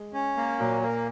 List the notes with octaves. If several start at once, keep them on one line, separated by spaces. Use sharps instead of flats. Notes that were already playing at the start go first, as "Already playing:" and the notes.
Already playing: G#3
C#4
A#3
A#2 F#3
A#3